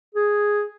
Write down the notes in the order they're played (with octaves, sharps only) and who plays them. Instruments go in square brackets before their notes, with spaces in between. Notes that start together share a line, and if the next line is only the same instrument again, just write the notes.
[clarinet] G#4